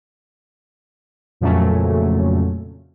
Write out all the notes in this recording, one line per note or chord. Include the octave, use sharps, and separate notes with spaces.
F2 A#2 C#3 F#3 A3 C#4